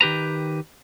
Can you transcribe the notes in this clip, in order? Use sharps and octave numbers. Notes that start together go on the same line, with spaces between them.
D#3 G4 B4 A#5